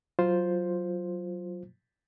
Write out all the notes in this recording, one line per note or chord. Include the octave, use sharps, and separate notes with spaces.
F#3 F4 C5